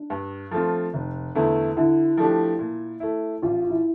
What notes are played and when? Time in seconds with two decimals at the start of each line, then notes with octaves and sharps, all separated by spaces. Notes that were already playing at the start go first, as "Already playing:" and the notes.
Already playing: D4
0.10 G2
0.51 F3 A3 C4 F4
0.94 F1
1.35 E2 D3 A3 E4
1.77 D3 E4
2.17 F3 A3 D4 G4
2.59 A#2
3.00 A3 E4
3.42 A1 F4
3.64 F4
3.70 E4